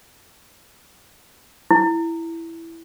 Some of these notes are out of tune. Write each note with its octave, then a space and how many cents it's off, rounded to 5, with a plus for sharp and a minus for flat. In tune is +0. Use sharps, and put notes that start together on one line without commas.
E4 +5